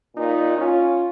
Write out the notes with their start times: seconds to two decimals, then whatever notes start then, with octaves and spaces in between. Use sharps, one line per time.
0.17 A#2 D#4
0.57 C#4 F4